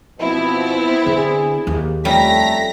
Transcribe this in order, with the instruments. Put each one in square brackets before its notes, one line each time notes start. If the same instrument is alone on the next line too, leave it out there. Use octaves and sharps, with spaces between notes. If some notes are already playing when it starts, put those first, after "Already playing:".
[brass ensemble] B2 F3 [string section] B3 C4 E4
[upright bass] D3 [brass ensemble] G#4
[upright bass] D#2
[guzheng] F2 G3 C#4 [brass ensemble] A3 [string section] A#5 A#6 B6